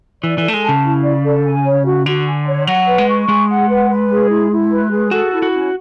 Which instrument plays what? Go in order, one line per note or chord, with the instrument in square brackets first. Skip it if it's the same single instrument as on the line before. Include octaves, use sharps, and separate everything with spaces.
[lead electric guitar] E3 [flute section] D5
[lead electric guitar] E3
[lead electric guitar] A3 [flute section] A4
[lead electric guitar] G#3
[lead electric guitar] C#3 [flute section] A5
[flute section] E4
D5
A4
G#5
C#5
F#4
[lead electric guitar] D3 [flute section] F#4
[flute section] G#5
C#5
[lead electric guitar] F#3 [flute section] F#5
[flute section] B4
[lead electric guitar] G#3
[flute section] C#6
[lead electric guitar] G#3 [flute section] G#4
[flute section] F#5
B4
B4
G#4
E4
E4
B4
G#4
[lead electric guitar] F#4 [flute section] A4
[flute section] E4
[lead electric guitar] F#4
[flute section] C#4